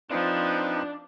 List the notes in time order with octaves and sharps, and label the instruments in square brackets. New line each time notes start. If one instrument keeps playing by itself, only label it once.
[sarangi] F3 [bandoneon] C4 D#4 B4 [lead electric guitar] D4